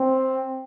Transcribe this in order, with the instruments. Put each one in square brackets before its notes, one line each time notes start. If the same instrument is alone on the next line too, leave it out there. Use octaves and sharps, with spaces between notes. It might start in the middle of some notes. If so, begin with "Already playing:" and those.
Already playing: [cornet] C4